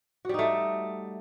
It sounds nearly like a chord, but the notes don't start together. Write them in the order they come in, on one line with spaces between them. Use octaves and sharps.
F#4 G3 D#4 A3